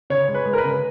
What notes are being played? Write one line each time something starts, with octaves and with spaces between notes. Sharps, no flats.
C#3 C#5
G#3
B4
G#3
A#4
B4
C#3